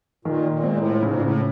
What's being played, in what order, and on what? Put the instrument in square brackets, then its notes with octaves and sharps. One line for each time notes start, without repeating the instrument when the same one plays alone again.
[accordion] A#2 [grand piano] D#3
[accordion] A#2
[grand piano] G#3 C4
[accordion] A2
[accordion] G#2 [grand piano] C#3
[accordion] A#2
A2